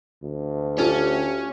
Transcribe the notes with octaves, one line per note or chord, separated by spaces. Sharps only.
D2
C#4 F4 G4 A4 D5